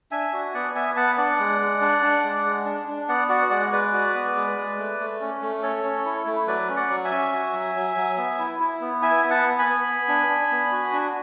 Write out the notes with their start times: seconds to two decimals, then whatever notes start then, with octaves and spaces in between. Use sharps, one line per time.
0.11 D4 E5 G#5
0.33 F#4
0.54 B3 D5 F#5
0.75 B3 E5 G#5
0.96 B3 F#5 A5
1.18 D4 D5 F#5
1.39 G#3
1.60 G#3
1.81 D4
2.03 D4
2.24 G#3
2.45 G#3
2.66 D4
2.88 D4
3.08 B3 D5 F#5
3.29 F#4 D5 F#5
3.50 G#3 D5 F#5
3.72 G#3 B4 D5
3.93 F#4
4.14 B3
4.36 G#3
4.57 G#3
4.78 A3
5.00 A3
5.21 C#4
5.42 A3
5.62 C#4 A4 C#5
5.83 C#4
6.05 E4
6.26 A3
6.47 F#3 B4 D5
6.69 C#4
6.76 D5 F#5
6.89 F#3
7.05 E5 G#5
7.12 C#4
7.32 F#4
7.53 F#3
7.75 F#3
7.97 F#3
8.17 B3
8.39 E4
8.60 E4
8.81 B3
9.02 E4 E5 G#5
9.24 B3
9.30 F#5 A5
9.44 B3
9.59 G#5 B5
9.66 B3
9.87 B3
10.09 D4
10.29 D4
10.51 B3
10.72 F#4
10.93 D4